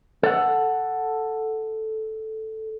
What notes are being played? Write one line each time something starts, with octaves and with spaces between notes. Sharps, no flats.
A4 F#5